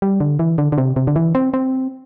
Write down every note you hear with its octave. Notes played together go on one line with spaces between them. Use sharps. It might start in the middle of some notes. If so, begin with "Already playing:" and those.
G3
D3
E3
D3
D3
C3
C3
D3
E3
C4
C4